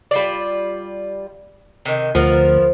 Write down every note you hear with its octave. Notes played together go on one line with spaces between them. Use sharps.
G3 F4 D5
C3 D#3
D2 F3 B3 A#4